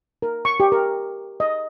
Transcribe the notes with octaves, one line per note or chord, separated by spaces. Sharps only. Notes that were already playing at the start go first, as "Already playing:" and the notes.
A#4
C#6
G4
A#4
D#5